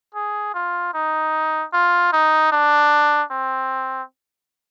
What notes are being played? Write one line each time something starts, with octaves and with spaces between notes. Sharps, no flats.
G#4
F4
D#4
F4
D#4
D4
C4